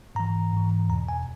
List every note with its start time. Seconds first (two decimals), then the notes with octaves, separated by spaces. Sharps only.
0.15 G#2 E3 A#5
0.53 G#2 E3
0.89 E2 B2 A#5
1.09 G#5